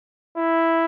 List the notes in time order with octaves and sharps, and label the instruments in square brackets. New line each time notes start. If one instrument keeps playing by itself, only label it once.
[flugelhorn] E4